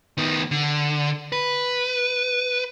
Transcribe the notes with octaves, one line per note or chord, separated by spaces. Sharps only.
D#3 B3
D3
B4